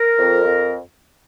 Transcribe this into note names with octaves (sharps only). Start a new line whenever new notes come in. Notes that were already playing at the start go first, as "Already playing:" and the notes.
Already playing: A#4
F2
F2